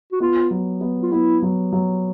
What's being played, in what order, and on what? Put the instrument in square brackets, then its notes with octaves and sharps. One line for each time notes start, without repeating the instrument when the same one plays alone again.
[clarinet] F#4
[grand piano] B3 [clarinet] F4
[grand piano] F#3
B3
[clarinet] F4
[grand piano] B3 [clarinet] E4
[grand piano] F#3
F#3